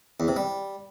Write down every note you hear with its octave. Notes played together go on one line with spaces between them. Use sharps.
E2
C3
G3